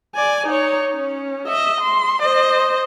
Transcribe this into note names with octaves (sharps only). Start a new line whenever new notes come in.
D5 G#5
D#4 C#5
C#4
D#5 E5
C6
C5 D#5